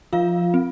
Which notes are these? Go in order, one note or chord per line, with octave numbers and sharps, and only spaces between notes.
F3 F4 F5
C4